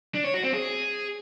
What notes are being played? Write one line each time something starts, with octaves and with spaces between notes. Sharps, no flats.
D4
C#5
F#4
C4
G#4